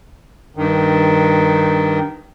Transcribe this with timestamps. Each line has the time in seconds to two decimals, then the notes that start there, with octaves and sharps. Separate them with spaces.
0.56 G2 D#3